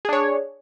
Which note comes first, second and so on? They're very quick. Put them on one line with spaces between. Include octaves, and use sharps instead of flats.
G#4 D4 C#5